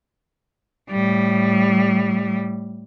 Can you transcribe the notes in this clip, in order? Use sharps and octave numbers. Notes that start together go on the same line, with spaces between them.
A2 G3